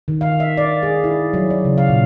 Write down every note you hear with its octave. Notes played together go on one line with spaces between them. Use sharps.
D#3
F5
E5
D5
G#4
E4
F#3
D5
C#3
F5
A#2